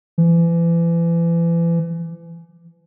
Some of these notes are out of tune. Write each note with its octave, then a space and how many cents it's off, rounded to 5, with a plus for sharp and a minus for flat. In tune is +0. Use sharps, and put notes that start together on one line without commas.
E3 +35